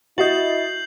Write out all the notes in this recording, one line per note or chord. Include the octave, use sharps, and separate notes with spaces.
E4 F#4 D#5 G6 A6 C7 F#7